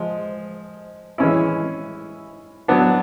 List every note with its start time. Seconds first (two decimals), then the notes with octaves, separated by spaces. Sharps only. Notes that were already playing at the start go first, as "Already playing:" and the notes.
Already playing: F3 G#3
1.18 E3 G#3 C#4 E4
2.68 F#3 B3 D4